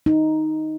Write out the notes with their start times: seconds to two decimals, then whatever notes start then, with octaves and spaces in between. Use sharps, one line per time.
0.06 D#4